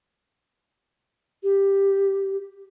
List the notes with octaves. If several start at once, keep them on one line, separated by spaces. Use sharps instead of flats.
G4